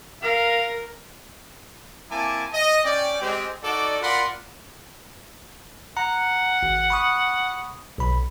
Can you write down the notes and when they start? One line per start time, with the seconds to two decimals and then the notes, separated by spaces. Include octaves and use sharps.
0.23 A#4 F5
2.11 A#3 C4 E4 G#5 A5 D6
2.53 D#5
2.85 C#4 D5 G5
3.22 G#3 C4 G4
3.63 D#4 F#4 A4 D5
4.02 F4 A#4 D5 F#5 B5 C6
5.97 F#5 A#5
6.63 G#1
6.90 B5 C#6 D#6
7.98 B1 B5